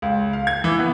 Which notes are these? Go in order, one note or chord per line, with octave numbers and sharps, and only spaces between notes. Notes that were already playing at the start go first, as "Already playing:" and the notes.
C#2
F5
G#6
E3
B3